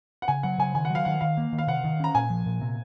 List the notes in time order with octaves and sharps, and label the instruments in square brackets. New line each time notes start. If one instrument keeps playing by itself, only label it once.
[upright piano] F#5
[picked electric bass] C#3 [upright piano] G#5
[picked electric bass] F#3 [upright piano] F#5
[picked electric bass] C#3 [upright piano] G#5
[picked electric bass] D#3 [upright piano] G#5
[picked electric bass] F#3 [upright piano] F#5
[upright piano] F5
[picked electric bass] D#3 [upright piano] F#5
[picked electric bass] D#3 [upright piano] F5
[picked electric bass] A#3
D#3
[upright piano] F5
[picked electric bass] C3 [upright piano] F#5
[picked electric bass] D#3
[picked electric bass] C#4 [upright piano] A#5
[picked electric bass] A#2 [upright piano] G#5
[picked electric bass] F3
A#2
C3